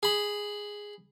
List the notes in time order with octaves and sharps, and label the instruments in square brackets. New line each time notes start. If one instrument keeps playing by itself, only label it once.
[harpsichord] G#4 B5